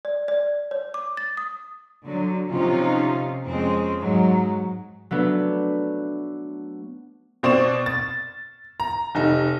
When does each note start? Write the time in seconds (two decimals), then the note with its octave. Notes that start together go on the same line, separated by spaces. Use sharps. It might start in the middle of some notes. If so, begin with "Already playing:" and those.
0.05 D5
0.28 D5
0.71 C#5
0.94 D6
1.17 A6
1.37 D#6
2.07 D3 F#3
2.52 C3 F3 C#4 D#4 F4
3.47 F2 G#3 C4 C#4
4.00 G#2 F#3
5.11 F#3 A3 B3 D4
7.43 B2 C4 D5 C#6 E7
7.86 A6
8.80 A#5
9.15 F1 D#4